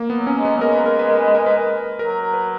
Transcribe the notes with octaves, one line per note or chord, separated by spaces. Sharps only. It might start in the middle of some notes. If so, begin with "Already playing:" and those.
Already playing: A#3
B3
F#3
C#4
G#3
B3
F#3
G#3 A#4
B4
A#4
B4
A#4
B4
A#4
B4
A#4
F#3 A#4
B4